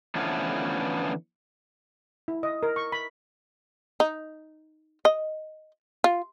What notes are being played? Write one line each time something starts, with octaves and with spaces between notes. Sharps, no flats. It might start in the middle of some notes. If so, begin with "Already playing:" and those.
D3 E3 F3 A3 B3 C#4
E4
D#5
A#4
C#6
B5
D#4
D#5
F4